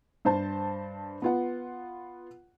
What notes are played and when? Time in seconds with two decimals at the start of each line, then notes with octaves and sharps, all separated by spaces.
0.25 G2 C5 A5
1.22 B3 F4 F#5